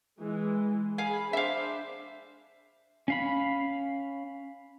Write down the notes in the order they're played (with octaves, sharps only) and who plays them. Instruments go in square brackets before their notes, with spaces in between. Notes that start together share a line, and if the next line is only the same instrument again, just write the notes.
[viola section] E3 G#3
[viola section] G#4 B5 [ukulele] F5 G#5
[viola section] D4 C5 [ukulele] E5 F5
[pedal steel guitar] C#4 F5 B5